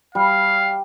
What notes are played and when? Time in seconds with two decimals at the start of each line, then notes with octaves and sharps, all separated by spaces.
0.15 G3 F5